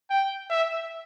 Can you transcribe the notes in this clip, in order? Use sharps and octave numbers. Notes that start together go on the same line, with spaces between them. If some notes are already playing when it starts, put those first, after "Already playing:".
G5
E5